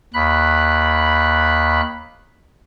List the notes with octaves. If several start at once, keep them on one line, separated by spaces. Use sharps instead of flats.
D#2 B5 F#6